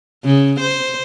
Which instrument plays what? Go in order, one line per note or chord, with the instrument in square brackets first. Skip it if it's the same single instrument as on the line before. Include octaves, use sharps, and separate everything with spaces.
[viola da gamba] C#3
C5